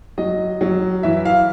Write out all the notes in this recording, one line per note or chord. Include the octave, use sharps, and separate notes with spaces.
F#3 D#5
F#3
E3 E5
F5